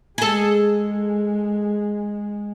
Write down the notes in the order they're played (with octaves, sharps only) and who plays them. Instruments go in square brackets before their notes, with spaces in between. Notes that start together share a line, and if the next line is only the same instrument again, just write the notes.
[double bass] G#3 [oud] G#4 A4